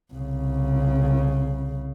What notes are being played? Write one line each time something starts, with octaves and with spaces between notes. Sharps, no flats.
C2 C#3